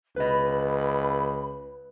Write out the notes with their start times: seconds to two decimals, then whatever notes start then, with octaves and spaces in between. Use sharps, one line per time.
0.16 C#2 B4 D#5 B5